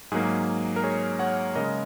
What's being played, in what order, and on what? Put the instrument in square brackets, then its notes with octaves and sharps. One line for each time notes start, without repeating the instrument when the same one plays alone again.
[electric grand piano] G#2 F#3 A#3 G#4
A#4
G#4 C#5
C#5 F#5
C#3 G#3 A#4 D#5